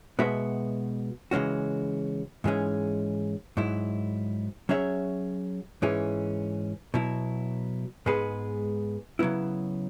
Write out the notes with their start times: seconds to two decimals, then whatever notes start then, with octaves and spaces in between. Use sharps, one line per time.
0.19 B2 G#3 B3 F#4 E5
1.31 C#3 E3 G#3 C#4 F#4
2.44 G#2 E3 G#3 C#4 G#4
3.57 G#2 F#3 E4
4.69 F#3 C#4 G#4 C#5 E5
5.82 G#2 E3 C#4 G#4
6.94 B2 F#3 E4
8.06 G#2 G#3 B3 G#4 B4
9.19 C#3 F#3 B3 E4